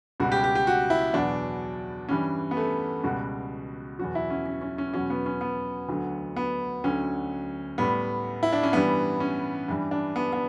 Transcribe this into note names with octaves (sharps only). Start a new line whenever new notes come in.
C#2 B2 G3 F#4
G4
G4
G4
F#4
E4
E2 B2 F#3 D4
G2 E3 G3 C#4
B3
A3
C#2 B2 G3 F#4
E2 B2 F#3 F#4
E4
C#4
C#4
C#4
C#4
E2 B2 F#3 C#4
B3
C#4
B3
D2 D3 F#3
B3
D2 D3 F#3 C#4
A2 G3 B3
E4
D4
C#4
G2 E3 G3 B3
C#4
G2 E3 G3
D4
B3
B3